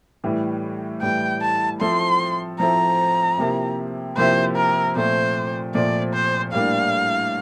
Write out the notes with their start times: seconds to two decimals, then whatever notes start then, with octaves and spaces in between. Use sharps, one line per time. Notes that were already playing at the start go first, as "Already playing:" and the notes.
0.24 A2 E3 G3
1.02 A2 E3 G3 G5
1.42 A5
1.81 F3 C4 E4 A4 C6
2.59 F3 C4 E4 A4 A#5
3.38 C3 F3 A#3 E4 G4
4.17 C3 F3 A#3 E4 G4 C5
4.56 A#4
4.96 A#2 F3 A3 C4 C5
5.75 A#2 F3 A3 C4 D5
6.14 C5
6.53 A2 G3 A#3 D4 F5